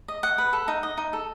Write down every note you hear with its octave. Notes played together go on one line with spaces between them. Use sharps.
D#5
D#5 F#5
B4
A4
D#4
D#5
D#4
A4